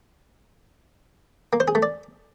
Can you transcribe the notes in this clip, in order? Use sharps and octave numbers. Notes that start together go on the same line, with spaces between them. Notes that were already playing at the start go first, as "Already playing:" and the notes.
A#3
C5
G#4
A3
D5